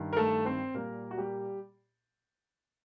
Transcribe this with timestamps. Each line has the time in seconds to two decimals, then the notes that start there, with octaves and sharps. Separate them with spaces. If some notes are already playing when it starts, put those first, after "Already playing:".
Already playing: G2 D#3
0.13 A#4
0.16 A3 A4
0.45 C4 C5
0.74 A#2 G3 A#3 A#4
1.11 F#4
1.17 G3 G4